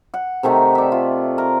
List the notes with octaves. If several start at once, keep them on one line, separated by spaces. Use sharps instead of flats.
F#5
C3 D#3 A3 D#4
D5 E5
F4
A#4